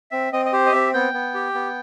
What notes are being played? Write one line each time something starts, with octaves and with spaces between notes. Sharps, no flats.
C4 E5
C4 D#5
D#5
G4 C5
D#5
C4 E5
B3 G5
B3
G4
B3